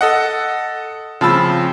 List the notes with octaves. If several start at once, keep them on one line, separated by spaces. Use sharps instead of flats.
A4 D#5 F#5
C#3 F3 C4 F4 A5 B5 E6